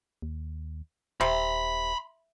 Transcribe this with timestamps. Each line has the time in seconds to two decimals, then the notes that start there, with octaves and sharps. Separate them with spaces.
0.22 D#2
1.21 D#1 C3 B5 C6